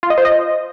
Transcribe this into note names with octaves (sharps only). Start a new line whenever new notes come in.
F4
D#5
C5
D#5